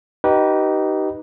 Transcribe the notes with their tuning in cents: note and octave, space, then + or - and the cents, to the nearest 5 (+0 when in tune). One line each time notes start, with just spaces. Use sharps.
D#4 +0 G4 -25 B4 -15